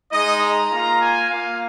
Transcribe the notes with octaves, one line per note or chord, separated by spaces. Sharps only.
G#3 D#4 D#5
A#5
A#3 F4 A#5
G#5
A#3 F4 F5